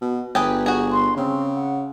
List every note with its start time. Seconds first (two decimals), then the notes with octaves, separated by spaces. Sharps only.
0.02 B2
0.35 G1 G4 G#4 B4
0.66 F#4 G#4
0.92 C6
1.17 C#3 C4
1.55 F#5